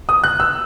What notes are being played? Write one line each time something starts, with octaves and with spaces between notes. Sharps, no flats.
D#6
F#6
E6